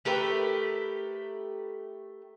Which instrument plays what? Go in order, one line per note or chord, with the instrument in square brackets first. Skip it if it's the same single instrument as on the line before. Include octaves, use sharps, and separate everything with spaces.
[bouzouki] A3 G4 A#4 B4